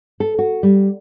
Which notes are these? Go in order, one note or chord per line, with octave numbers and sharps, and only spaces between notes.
A4
F#4
G3